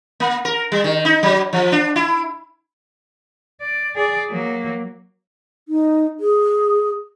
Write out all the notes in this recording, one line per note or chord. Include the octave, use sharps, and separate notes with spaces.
A#3
A#4
G3
D#3
D#4
F#3
F3
D4
E4
D5
G#4 D5
F#3 A#3
D#4
G#4